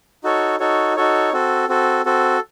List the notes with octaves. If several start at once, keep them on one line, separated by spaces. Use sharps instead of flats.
D#4 F#4 A4 C#5
D#4 F#4 A4 C#5
D#4 F#4 A4 C#5
C4 F#4 A4
C4 F#4 A4
C4 F#4 A4